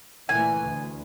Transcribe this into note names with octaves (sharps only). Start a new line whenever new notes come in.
A#2 E3 A3 G#5
D2